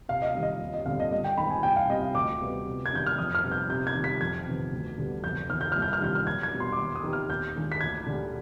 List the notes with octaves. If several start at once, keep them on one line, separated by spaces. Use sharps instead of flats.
C3 F5
D#5
F5
D#3 G3
D#5
D#2
D#5
D3 G3 C4 F5
D#5
G2 D#5
G5
D#3 G#3 C4 B5
G#5
C2 G5
F5
C3 G3 D#5
F5
D2 D6
C3 G3 B3 F4
C3
G#6
D#3 G3 D4 G6
F6
F2 D#6
F6
C3 G3 B3 D#4
G6
C3 G6
G#6
D#3
G3 B6
F2 G#6
C3 D#3 B3
D2
D3 G3 B3
F1 G6
F2 D#3 F6
G6
C2 F6
G6
F6
C3 D#3 G3 D4 G6
F6
B1 G#6
G#6
B2 G3 B3 D4
C6
D6
D#2 C6
D#6
D#3 B3 D#4 G4
F6
D#2 G6
D#3 G#3 D4 F4
B6
D2 G#6
D3 G#3 D4 G4